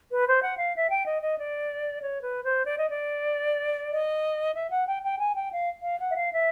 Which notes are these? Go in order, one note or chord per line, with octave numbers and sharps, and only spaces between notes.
B4
C5
F#5
F5
E5
G5
D#5
D#5
D5
C#5
B4
C5
D5
D#5
D5
D#5
E5
F#5
G5
G5
G#5
G5
F5
F5
F#5
E5
F5
E5